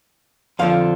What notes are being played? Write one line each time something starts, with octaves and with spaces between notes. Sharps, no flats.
F2 D3 F3 F5